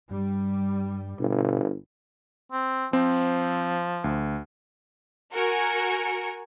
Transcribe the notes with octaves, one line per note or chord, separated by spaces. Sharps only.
G2 G3
G1 B2
C4
F3 C4
D2
F#4 A#4 G#5 C#7